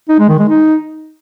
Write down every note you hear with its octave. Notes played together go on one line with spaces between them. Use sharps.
D#4
G#3
D#3
G#3
D#4